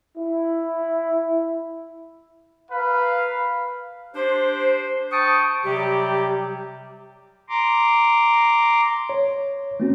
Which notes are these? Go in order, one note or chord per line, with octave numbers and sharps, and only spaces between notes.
E4
A#4 B4 F5
D4 G4 C5
G5 A5 C#6 D#6
C3 F#3 G3 G4
A#5 C6 D6
C#5
A3 A#3 C4 C#4 F#4